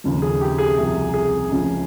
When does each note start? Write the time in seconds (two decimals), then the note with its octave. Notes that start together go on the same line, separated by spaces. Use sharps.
0.04 D#2 C#3 F3
0.22 G#4
0.41 G4
0.58 G#4
0.77 C2 C3 F3
1.14 G#4
1.50 C#2 C#3 F3